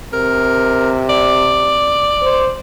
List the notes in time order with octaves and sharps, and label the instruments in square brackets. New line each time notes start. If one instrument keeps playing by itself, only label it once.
[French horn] C3 [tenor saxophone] A#4
[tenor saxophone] D5
[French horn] C5